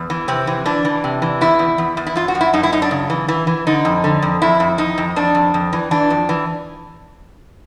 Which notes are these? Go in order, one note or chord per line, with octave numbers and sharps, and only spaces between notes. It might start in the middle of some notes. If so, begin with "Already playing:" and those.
Already playing: E2
E3
C3 C4
E3
E3 D4
E3
C3
E3
E2 E4
E2
E2
E2
E4
F#2 F4
F#4
F#2
E4
F#2 D#4
E4
F#2 D#4
D4
C#3
E3
E3
E3
D3 D#4
F2
D3
F2
F2 E4
F2
F2 D#4
F2
F2 D4
F2
F2
E3
E3 D4
F2
E3